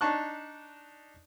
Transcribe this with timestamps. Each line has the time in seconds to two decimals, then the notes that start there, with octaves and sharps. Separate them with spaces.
0.01 D4 D#4 A5 C#6 F#6